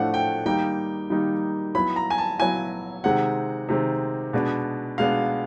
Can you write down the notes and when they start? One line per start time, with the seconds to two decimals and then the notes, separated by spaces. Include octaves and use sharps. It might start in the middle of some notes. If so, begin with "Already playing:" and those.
Already playing: A2 F3 A3 D4 F#5
0.14 G5
0.46 D#3 G3 A#3 D#4 G5
1.10 D#3 G3 A#3 D#4
1.75 F#3 B3 E4 B5
1.96 A#5
2.10 G#5
2.18 A5
2.39 F#3 B3 E4 G#5
3.04 C3 D#3 G#3 C4 F#5
3.69 C3 D#3 G#3 C4
4.33 B2 G#3 B3 D4
4.98 B2 G#3 B3 D4 F5